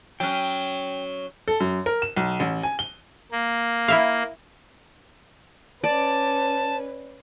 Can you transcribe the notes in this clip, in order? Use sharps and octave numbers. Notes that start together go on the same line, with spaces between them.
F#3 C#4 G5
A4
F#2
A#4
E7
B1
A1
G#5
G7
A#3
E4 E5 F5
C#4 B4 D5 A5